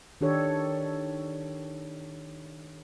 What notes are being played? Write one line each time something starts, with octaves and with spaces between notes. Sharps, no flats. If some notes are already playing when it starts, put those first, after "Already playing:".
D#3 D4 G4 A4 C#5